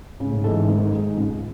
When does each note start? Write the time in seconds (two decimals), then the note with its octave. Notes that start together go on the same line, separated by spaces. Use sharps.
0.20 G#2 C#3
0.28 A2
0.37 G#2
0.44 E3 G#3 D#4 A4
0.69 D#3
0.93 G#3 D#4
1.17 C#2 G#2